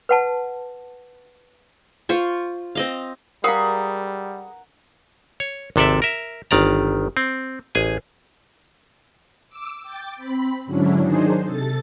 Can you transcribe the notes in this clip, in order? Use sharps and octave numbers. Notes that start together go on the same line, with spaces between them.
B4 F#5 A5
F4 C5 C#6
C4 D#5 F5
G3 G#4 A#4 F5 F#5 A#5 B5 C#6
C#5
G#1 C3 A4 D5 E5
A#4 E5
G1 D#3 D5 A#5
C4
A1 G#4 G#5
D6 E6
G5 D6 A6
C4 B5
G#2 D3 F#3 C#4 D4 E4
D#3 F#3 D4 D#4 G#4 C5
C3 A4 A6